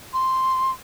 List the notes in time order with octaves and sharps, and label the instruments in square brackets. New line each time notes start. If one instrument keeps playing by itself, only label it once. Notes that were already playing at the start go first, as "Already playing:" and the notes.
[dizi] C6